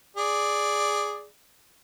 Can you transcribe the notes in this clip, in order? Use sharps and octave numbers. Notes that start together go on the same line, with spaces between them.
G#4 D5